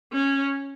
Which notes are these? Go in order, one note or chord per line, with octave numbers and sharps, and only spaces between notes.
C#4